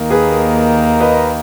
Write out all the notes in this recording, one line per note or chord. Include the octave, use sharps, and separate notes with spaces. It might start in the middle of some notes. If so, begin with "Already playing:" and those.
Already playing: D#2 D#3 A#3
G#4 B4
B4 D#5